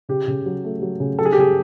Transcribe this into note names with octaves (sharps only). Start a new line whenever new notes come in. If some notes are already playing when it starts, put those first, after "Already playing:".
C#3 G4
C#3
F#3
A3
F#3
C#3
F#3 A4
G#4
G4
C#3 G#4